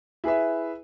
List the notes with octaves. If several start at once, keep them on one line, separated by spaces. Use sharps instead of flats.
E4 G#4 B4 E5